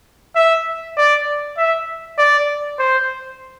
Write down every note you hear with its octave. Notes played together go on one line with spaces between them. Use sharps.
E5
D5
E5
D5
C5